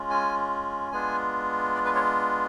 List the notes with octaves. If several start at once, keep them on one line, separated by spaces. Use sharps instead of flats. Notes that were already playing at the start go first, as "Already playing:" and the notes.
Already playing: G#3 C#4 F4
G#5
G#3 B3 D4 F4 G#5
D5
B4
C#5